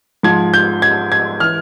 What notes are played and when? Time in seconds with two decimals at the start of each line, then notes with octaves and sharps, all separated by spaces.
0.23 G#2 F3 G#6
0.54 G6
0.82 G#6
1.12 G#6
1.40 E3 F6